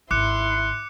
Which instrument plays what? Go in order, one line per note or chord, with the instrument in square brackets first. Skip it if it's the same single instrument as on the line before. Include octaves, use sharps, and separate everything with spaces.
[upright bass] G#1 [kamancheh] E4 C6 [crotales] D6 F#6 C#7